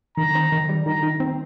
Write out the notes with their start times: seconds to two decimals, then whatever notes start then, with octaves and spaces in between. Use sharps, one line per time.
0.17 D#3 A#5
0.35 C4
0.52 D#3
0.69 G3
0.86 D#3 A#5
1.03 D#3
1.20 C4